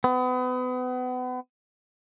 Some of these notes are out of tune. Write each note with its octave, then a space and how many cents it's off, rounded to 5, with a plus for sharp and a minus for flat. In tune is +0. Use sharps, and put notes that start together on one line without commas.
B3 +35